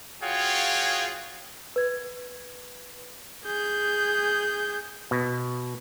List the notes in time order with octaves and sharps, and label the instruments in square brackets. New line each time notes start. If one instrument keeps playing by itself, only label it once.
[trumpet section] F4 F#4 G#4 C#5 F5 G5
[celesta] B4 G#6
[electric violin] G#4 G6
[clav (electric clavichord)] B2